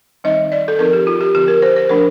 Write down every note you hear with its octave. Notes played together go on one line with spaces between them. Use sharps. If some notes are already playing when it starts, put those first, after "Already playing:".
D#3 G3 C4 D#4 D#5
D5
A4
F3 C4 D#4 A#4
G4
F4
G4
D3 F3 C4 G4
A#4
C5
C5
F3 A3 D4 A#4